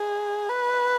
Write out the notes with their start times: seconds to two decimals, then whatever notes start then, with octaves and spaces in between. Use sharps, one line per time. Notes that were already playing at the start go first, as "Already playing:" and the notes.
Already playing: G#4
0.50 B4